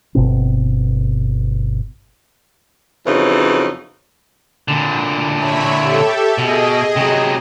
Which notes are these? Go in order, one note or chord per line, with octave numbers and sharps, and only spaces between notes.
G1 B2 C4
F2 C#3 E3 F#3 D#4
A#2 D3
C#5 E5 B5
G4 A4 E5
B2 G#4 D#5
C3 F#3